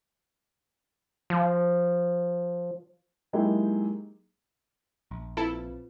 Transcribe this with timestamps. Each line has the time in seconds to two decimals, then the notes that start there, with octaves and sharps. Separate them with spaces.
1.30 F3
3.33 F#3 G#3 A#3 D#4 E4 G4
5.11 A#1
5.37 C4 E4 F4 A4 B4